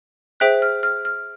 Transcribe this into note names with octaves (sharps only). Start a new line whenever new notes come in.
G#4 C5 E5 G5 F#6
F6
F6
F6